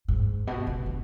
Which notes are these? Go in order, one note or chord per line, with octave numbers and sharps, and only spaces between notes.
G#2
B2
C#3
D3